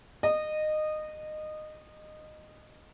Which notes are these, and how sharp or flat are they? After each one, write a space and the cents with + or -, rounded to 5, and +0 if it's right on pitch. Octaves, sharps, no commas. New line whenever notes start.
D#5 -20